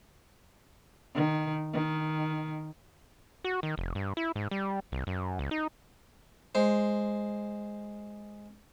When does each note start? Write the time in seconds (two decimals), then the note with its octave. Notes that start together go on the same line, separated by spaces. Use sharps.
1.15 D#3
1.74 D#3
3.44 F#4
3.63 D#3
3.78 F1
3.95 G2
4.17 E4
4.36 G#2
4.51 G3
4.92 C2
5.07 F#2
5.39 C#2
5.51 D#4
6.55 G#3 C5